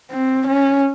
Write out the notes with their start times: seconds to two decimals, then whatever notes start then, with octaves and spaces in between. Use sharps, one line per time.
0.11 C4
0.47 C#4